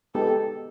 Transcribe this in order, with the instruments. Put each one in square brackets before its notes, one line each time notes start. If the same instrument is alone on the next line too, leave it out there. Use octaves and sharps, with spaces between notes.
[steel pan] G#3 B3 D#4 G4 [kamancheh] A4